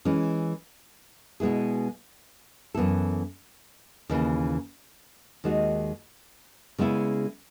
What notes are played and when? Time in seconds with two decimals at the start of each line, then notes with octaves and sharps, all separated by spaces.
0.05 E3 G#3 C#4
1.40 B2 G#3 B3 E4 G#4
2.74 F#2 E3 B3 E4 A4
4.10 D#2 C#3 E3
5.44 D#2 D#3 G#3 D#4 F#4
6.78 C#3 G#3 B3 E4